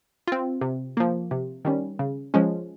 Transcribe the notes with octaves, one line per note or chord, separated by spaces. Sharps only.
C4 F4
C3
F3 A#3
C3
D#3 G3 C#4
C#3
F3 G#3 C#4